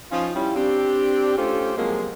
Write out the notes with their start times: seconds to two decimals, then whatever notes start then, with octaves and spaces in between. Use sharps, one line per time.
0.12 F3 C#4 D#4 F4
0.35 G3 C#4 E4
0.56 C4 D4 G4
1.38 A3 C#4 F4 G4 A4 C5
1.78 C3 F3 F#3 G#3 A#3